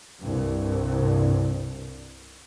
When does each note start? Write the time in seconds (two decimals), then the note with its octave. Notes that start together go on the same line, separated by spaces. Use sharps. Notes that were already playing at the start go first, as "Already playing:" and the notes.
0.22 C2 G2